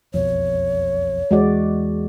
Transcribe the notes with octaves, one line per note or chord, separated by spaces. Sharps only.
E1 B1 F2 C#5
E2 G#3 F#4 D5